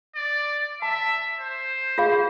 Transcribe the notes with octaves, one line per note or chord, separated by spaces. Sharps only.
D5
E5 A5
C5
F4 G#4 F5